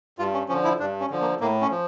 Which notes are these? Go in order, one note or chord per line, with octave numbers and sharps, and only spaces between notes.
G2 F4
C#4
D3 F3 C#4
E4
G2 D4
C#4
D3 F3
A#3
A2 A#3
C#4
F3